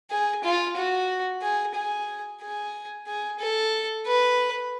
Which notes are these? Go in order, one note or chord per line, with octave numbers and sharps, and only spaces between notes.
G#4
F4
F#4
G#4
G#4
G#4
G#4
A4
B4